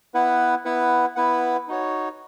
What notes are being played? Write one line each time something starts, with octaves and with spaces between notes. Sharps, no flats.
B3 E4 B4 F#5
B3 E4 B4 F#5
B3 E4 B4 F#5
D#4 F#4 C#5